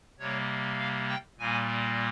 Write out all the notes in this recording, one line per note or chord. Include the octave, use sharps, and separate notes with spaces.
C3 G3 A#3 C#5
F5
G5
A#2 G3 A#3 G#5